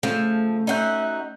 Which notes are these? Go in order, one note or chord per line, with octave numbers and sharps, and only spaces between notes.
C#3 F3 A3
C#4 D#4 F#4 E5 G6